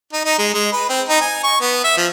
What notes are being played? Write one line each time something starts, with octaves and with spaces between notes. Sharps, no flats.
D#4
D#4
G#3
G#3
B4
C4
D#4
G#5
C#6
B3
E5
F3